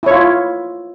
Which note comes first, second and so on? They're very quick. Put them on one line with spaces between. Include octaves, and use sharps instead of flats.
E4 C#5 F4